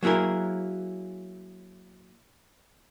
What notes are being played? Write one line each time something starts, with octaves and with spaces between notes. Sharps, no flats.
F#3 A#3 E4 G#4 A#4